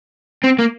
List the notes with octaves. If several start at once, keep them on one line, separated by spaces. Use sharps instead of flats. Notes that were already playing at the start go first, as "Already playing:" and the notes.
C4
A#3